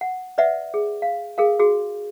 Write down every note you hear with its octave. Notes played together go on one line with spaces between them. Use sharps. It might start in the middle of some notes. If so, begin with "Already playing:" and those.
F#5
B4 D5 E5 F#5
G#4
F5
G#4 A#4 F5
F#4 G#4